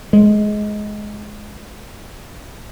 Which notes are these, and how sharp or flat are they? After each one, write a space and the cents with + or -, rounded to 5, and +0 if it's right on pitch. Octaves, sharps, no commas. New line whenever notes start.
G#3 +15